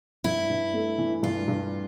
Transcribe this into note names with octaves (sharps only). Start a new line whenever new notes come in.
G2 E4
G2
A3
E3
G2 F4
G2